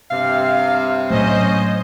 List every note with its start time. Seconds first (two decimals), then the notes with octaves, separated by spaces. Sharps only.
0.11 G2 C3 F5
1.10 A2 F#3 A3 C#4 C5 D#5